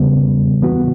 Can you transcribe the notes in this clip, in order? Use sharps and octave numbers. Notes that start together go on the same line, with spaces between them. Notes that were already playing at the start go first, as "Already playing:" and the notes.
Already playing: E2 C#3 G3 B3
E3 B3 F#4